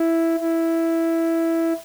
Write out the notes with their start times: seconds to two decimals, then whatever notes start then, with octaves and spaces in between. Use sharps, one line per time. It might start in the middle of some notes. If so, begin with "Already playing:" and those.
Already playing: E4
0.40 E4